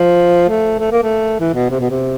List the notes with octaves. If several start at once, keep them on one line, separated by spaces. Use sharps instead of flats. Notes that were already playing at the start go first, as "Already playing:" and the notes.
Already playing: F3
A3
A3
A#3
A3
E3
B2
C3
B2
C3